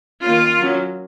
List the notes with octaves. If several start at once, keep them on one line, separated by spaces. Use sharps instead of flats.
D#3 A#3 C#4 F4
F#3 A#3 C#4